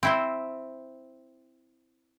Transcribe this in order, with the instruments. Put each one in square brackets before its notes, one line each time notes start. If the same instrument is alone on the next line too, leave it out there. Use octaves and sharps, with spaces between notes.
[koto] C4 E4 C5